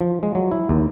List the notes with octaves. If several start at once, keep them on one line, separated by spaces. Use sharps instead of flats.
F3
G#3
F#3
E4
D#2